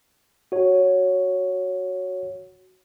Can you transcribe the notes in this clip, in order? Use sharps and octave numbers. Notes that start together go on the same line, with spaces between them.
F#4 C#5